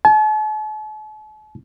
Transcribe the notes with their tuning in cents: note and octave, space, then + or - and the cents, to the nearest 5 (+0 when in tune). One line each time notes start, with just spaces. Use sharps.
A5 -45